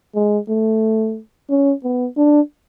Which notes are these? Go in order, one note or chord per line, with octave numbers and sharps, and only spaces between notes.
G#3
A3
C#4
B3
D4